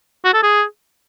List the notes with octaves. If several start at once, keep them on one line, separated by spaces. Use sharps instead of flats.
F#4
A4
G#4